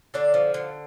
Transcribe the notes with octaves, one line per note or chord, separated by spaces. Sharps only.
D3 D4 D5
F3
D3